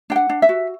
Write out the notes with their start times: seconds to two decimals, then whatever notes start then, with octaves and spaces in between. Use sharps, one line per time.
0.10 D4 G5
0.16 F#5
0.29 D4
0.42 E5
0.49 F#4